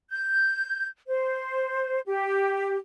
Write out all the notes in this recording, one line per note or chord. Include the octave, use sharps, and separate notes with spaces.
G6
C5
G4